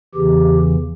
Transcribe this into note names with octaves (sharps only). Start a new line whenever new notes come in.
E2 C#3 E3 G4